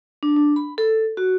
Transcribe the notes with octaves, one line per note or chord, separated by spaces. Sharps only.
D4
D4
B5
A4
F#4